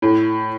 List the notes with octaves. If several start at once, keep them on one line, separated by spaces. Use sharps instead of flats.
A2